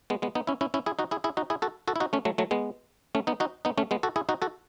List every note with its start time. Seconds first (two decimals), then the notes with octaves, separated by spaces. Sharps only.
0.10 G#3 B3
0.22 G#3 B3
0.35 B3 D#4
0.47 C#4 E4
0.61 C#4 E4
0.74 C#4 E4
0.86 E4 G#4
0.99 D#4 F#4
1.11 E4 G#4
1.24 E4 G#4
1.37 D#4 F#4
1.50 E4 G#4
1.62 F#4 A4
1.88 F#4 A4
1.96 E4
2.00 D#4 F#4
2.13 A3 C#4
2.25 F#3 A3
2.38 F#3 A3
2.51 G#3 B3
3.15 A3 C#4
3.27 B3 D#4
3.40 D#4 F#4
3.65 B3 D#4
3.78 A3 C#4
3.91 G#3 B3
4.03 F#4 A4
4.16 E4 G#4
4.29 D#4 F#4
4.42 F#4 A4